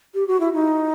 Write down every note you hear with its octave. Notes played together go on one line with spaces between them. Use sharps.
G4
F#4
E4
D#4